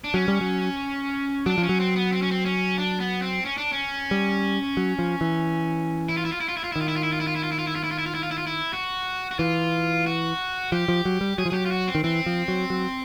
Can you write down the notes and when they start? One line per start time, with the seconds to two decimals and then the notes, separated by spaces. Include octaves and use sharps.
0.04 D4
0.14 F#3 C#4
0.28 G3
0.41 F#3
1.46 F#3 D4
1.58 F3
1.63 C#4
1.69 F#3
1.80 C4
1.96 B3
2.12 C4
2.22 C#4
2.31 C4
2.45 C#4
2.78 D4
3.00 B3
3.22 C4
3.45 C#4
3.58 D4
3.72 C#4
4.11 G3
4.77 F#3
4.99 F3
5.21 E3
6.09 E4
6.17 F4
6.25 E4
6.32 F4
6.40 E4
6.48 F4
6.57 E4
6.64 F4
6.72 E4
6.76 D#3
6.81 F4
6.88 E4
6.96 F4
7.03 E4
7.12 F4
7.20 E4
7.27 F4
7.35 E4
7.43 F4
7.52 E4
7.59 F4
7.67 E4
7.75 F4
7.83 E4
7.91 F4
7.98 E4
8.06 F4
8.14 E4
8.23 F4
8.31 E4
8.38 F4
8.47 E4
8.73 F#4
9.31 F#4
9.39 E3 F4
10.06 F#4
10.72 F3 G4
10.88 F3
11.05 F#3
11.21 G3
11.38 F#3 G#4
11.46 F3
11.50 F#3 G4 G#4
11.65 F4
11.71 F#4
11.87 C4
11.95 D#3
12.04 E3 C4
12.26 F3
12.48 F#3
12.70 F#3